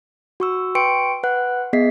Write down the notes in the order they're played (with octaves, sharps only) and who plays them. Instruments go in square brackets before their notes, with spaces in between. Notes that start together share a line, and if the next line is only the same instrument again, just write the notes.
[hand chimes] F#4 C#6 E6
B4 G5 C6 C#6 C#7 D7
B4 F#5 F#6
B3 G#4 D#5 E5 B6 C7